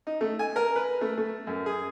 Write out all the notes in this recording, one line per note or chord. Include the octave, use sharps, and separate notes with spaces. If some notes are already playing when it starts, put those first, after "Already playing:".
D#4
A3
G#5
A#4
B4
A3
A3
F#2
G#4